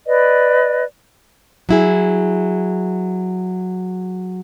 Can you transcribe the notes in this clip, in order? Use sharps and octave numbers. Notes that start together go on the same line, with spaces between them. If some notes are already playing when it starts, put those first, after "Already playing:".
B4 D5 D#5
F#3 E4 G#4